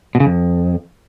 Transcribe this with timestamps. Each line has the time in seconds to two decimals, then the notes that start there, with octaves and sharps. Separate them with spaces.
0.15 B2
0.20 C#3
0.26 F2